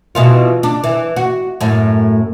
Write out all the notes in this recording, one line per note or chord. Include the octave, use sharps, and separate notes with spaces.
B2 E3 F4
D4
E3
F#4
F#2 A2